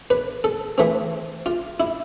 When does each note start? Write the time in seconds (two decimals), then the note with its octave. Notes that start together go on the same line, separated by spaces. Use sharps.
0.10 B4
0.44 A4
0.78 E3 A3 C4
1.46 F4
1.80 E4